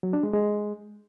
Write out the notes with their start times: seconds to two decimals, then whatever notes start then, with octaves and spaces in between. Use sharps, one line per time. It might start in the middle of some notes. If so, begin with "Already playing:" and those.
0.03 F#3
0.13 D4
0.23 G#3
0.33 G#3